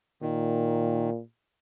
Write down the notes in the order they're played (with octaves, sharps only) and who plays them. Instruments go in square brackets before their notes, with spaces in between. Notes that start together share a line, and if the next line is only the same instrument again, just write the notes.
[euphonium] A#2 [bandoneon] D#3